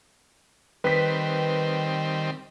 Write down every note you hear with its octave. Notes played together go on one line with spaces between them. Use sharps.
D#3 G3 C4 B4 B6